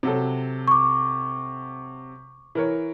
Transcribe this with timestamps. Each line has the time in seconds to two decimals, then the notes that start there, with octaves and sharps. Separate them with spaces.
0.03 C3 F#3 A4
0.68 C#6 D6
2.55 E3 A#4 C#5